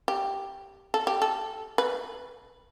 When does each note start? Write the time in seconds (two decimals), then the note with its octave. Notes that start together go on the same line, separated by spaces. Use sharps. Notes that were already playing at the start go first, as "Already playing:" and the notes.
0.08 G4
0.94 A4
1.07 G4
1.22 A4
1.78 B4